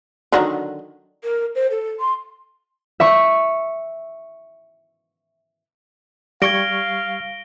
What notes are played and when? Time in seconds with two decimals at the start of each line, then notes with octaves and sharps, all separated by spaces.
0.32 D3 D#3 F#3
1.24 A#4
1.55 C5
1.71 A4
2.00 C6
3.00 E5 C#6
6.42 G3 F5 C#6 G#6 A#6 D7 G7